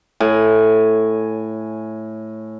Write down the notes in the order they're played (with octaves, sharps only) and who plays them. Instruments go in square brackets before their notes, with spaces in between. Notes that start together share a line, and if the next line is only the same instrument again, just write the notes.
[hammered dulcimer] A2 G#5